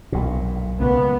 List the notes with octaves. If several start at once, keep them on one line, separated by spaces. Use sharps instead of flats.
B1 A#2
C#2 A#2 B3